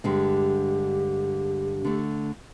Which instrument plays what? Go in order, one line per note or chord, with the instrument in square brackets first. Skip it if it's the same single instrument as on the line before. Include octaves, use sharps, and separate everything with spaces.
[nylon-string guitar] G2 D3 G#3 [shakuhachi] G4
[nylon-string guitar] D3 A3